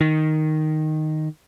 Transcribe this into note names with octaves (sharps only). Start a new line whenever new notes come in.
D#3